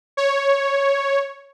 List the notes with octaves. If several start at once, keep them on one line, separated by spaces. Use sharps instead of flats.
C#5